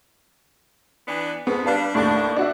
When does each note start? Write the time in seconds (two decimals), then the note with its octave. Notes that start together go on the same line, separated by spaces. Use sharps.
1.08 E3 B3 D4
1.47 F2 G#2 B3
1.66 G3 D4 B4 F5 A5
1.95 D#2 A2 D4
2.36 D4 F#4 E5